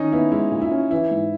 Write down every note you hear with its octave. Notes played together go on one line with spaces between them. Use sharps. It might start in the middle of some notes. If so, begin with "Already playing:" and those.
Already playing: D#3 C#4 D#4
B3 E4
G#3 E4
A#2
E4
C#4
E3 E4
G#2